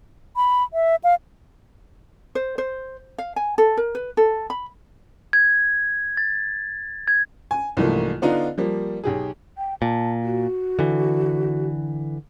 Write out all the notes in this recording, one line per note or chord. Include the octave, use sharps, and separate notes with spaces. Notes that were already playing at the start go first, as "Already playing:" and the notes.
B5
E5
F5
C5
C5
F5
G#5
A4
A#4
B4
A4
B5
G#6
A6
G#6
G#5
C2 G#2 E3 F3 A3 A#3
D3 B3 D4 D#4 F4
F3 G3 A#3
B1 G4 G#4
G5
A#2 A5
F#4
D3 E3